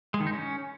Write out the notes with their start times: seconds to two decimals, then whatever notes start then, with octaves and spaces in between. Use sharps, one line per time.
0.14 G#3
0.20 D#3
0.27 D#4
0.33 C#4